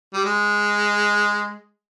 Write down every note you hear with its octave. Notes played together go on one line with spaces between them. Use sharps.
G3
G#3